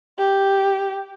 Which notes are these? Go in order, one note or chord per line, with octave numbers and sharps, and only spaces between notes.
G4